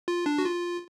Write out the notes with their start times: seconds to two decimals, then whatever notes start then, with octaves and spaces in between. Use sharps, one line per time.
0.08 F4
0.26 D4
0.38 F#4
0.45 F4